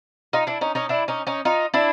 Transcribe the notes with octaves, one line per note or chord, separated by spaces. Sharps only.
D#4 F4
D4 E4
C#4 D#4
C#4 D#4
D4 E4
C#4 D#4
C#4 D#4
D#4 F4
D4 E4